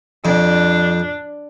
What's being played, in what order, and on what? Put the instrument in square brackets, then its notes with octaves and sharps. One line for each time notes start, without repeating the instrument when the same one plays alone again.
[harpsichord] F2 [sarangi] D4